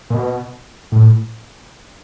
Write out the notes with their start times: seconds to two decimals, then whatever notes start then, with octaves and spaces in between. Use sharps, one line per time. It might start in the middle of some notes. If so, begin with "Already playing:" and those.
0.10 A#2
0.14 B2
0.92 A2